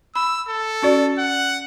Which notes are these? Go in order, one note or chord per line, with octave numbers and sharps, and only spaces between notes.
B5 E6
A4
C#4 F#4 D5
F#5